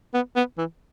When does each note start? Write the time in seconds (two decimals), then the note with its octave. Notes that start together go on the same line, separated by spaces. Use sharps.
0.14 B3
0.36 B3
0.58 E3